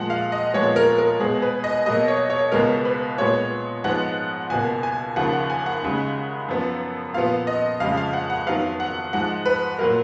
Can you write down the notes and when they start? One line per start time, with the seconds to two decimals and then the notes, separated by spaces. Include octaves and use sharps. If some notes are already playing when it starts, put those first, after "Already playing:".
Already playing: A#2 F3 G#3 F#5
0.10 F5
0.32 D#5
0.54 A#2 F3 G#3 B3 C#5
0.76 A#4
0.98 A#4
1.20 B2 G#3 B3 G#4
1.42 B4
1.64 D#5
1.86 B2 F#3 A#3 D#5
2.08 C#5
2.30 C#5
2.52 C#2 B2 G#3 B3 A#4
2.85 B4
3.18 A#2 G#3 B3 C#5
3.84 G#2 F3 G#3 B3 F#5
4.50 C#2 B2 A#3 G#5
4.83 G#5
5.16 D#2 C#3 F3 A#3 F#5
5.33 F#5
5.50 G#5
5.66 F#5
5.83 D#2 C#3 G#3
6.49 F#2 F3 B3
7.14 A#2 F3 B3 F5
7.47 D#5
7.80 F2 C#3 F3 G#3 F5
7.97 F5
8.13 F#5
8.30 F#5
8.47 F2 D#3 F#3 B3 F5
8.80 F#5
9.13 G#2 F3 G#3 F#5
9.46 B4
9.79 A#2 F#3 A#3 A#4